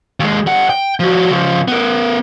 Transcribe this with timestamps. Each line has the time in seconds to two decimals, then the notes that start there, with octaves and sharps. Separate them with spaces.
0.20 D#2 G#3
0.47 G3 F#5
0.70 G5
1.00 F3 F#4
1.31 C#3 F3
1.68 B3 A#4